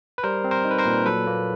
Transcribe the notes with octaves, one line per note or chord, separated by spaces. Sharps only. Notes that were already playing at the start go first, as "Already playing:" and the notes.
B4
G3 A#4 C5
C4
A#4 C5
D#4
B4
A#4 C5
A#2
F#3 A4 B4
A#3